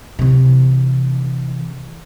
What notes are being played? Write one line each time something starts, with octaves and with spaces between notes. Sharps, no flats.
C3 E3